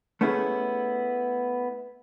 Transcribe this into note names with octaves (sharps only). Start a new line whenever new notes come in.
A3 B3 C#4 E4 G#4